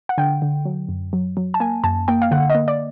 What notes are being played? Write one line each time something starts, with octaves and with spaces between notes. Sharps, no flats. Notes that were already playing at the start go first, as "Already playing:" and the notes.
F#5
D3 G5
D3
F#3
F#2
F#3
F#3
A5
A#3 G#5
F#2 A5
A#3 G5
F5
D3 F#5
D#5
A#3
D5